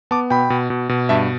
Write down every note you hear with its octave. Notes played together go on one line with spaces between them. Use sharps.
B3 A5 D6
B2 G5 B5
B2
B2
B2
G2 E5 A5